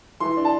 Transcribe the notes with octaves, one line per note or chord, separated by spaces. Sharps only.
E3 C6
D4
A5